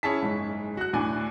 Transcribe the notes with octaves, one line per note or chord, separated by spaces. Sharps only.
C#4 E4 G#4 A5 B6
F#1 G#2
F#4 F#6
D2 A2 D4 G#5